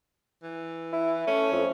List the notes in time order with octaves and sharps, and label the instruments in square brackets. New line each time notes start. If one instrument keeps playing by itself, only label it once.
[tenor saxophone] E3
[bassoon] E4
[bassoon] A3 [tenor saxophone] C#4
[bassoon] F2